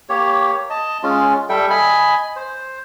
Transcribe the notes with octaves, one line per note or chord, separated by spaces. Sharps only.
A#3 G4 C#5
D#5 A5
G#3 C#4 F4
G3 A4 E5 G5
D#5 G#5 B5
C5